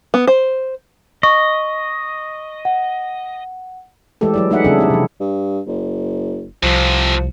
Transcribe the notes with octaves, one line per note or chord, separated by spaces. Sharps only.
B3
C5
D#5 C#6
F#5
E3 G#3 A3 G4 A4
F#3 E4 D5
A3 D#4 G#4 E5 F#5
C#3 G3 C4 D4 G#4 A4
C4 E4 G4
C3 F3
G2
F#1
C2 F2 C3 F3